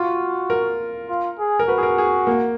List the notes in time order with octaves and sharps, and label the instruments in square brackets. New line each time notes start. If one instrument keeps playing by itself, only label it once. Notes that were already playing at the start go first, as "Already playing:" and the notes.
Already playing: [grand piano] F4 [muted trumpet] F#4
[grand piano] A#4
[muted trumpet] F4
G#4
[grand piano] A#4
[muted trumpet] F#4 [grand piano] B4
[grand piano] G#4
A#4
G#4
A#3